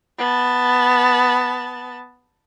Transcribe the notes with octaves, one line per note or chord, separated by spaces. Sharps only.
B3 A5